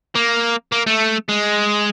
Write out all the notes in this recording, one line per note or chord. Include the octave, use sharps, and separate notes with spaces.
A#3
A#3
A3
G#3